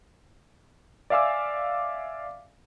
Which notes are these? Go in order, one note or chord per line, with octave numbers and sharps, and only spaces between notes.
D5 E5 F5 G#5 D6 E6